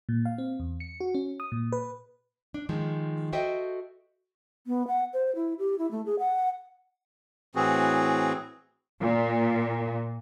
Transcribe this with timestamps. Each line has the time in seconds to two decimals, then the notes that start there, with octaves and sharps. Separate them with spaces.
0.09 A#2
0.26 F5
0.38 C4
0.60 E2
0.80 C#7
1.01 F#4
1.15 C#4
1.40 D#6
1.52 A#2
1.72 B4
2.54 D4
2.69 D#3 F3 G#3
3.32 F#4 A4 C5 D#5 E5 G5
4.67 B3
4.88 F#5
5.13 C5
5.35 E4
5.59 G4
5.79 E4
5.91 A3
6.06 G#4
6.19 F#5
7.55 A2 E3 C4 F#4 G#4
9.01 A#2